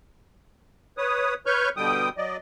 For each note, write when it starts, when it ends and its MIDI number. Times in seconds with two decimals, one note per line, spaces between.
0.98 1.34 71
0.98 1.34 73
0.98 1.34 87
1.46 1.69 71
1.46 1.69 73
1.46 1.69 85
1.46 1.69 89
1.46 1.69 91
1.77 2.09 47
1.77 2.09 50
1.77 2.09 55
1.77 2.09 79
1.77 2.09 87
2.17 2.37 54
2.17 2.37 74
2.17 2.37 75